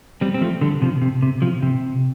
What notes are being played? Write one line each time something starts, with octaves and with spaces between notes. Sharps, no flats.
G3 C4
C4
F3 A3
D3 G3
C3 F3
C3
C3
C3 F3
C3